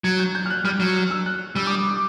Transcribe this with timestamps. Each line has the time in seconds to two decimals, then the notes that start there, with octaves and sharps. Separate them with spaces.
0.04 F#3 G#6
0.19 G6
0.35 G6
0.46 F6
0.50 F#6
0.65 G3 F6
0.80 F#3
0.96 F6
1.10 E6
1.26 F#6
1.56 G3 E6
1.67 D6
1.71 D#6
1.86 D6